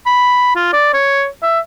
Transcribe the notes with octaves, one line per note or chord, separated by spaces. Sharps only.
B5
F4
D5
C#5
E5